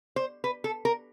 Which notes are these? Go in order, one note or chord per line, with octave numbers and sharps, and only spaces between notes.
C5
B4
A4
A#4